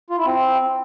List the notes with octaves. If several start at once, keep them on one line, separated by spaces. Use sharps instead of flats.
F4
E4
C4